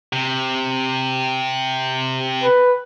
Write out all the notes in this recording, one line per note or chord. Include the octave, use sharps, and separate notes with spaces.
C3
B4